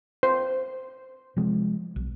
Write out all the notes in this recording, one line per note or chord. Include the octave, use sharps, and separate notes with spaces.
C5
C3 F3 G#3
B1